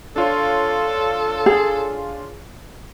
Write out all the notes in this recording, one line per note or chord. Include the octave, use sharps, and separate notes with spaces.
D4 F4 A4 C#5
G#4